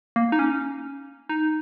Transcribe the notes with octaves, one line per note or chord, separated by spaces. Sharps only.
A#3
D#4
C#4
D#4